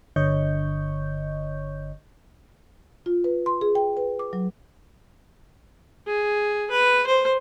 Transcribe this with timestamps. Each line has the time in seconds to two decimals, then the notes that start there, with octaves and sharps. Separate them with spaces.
0.16 G1 D3 C#5 D#5 C#6 G6
3.06 F4
3.24 B4
3.46 C6
3.61 G#4
3.75 G5
3.97 B4
4.19 D6
4.33 F#3
6.07 G#4
6.71 B4
7.07 C5